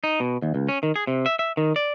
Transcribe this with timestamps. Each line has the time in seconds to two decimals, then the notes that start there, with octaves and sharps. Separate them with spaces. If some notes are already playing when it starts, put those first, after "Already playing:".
0.04 D#4
0.20 B2
0.42 D#2
0.55 C#2
0.69 C#4
0.83 D#3
0.96 G#4
1.07 C3
1.26 E5
1.39 E5
1.57 D#3
1.76 D5